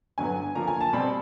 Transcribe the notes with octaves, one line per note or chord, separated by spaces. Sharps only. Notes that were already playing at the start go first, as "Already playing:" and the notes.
G2 D3 F#3 B3 G#5
D3 F3 A#3 A#5
G#5
A5
B2 G3 C4 B5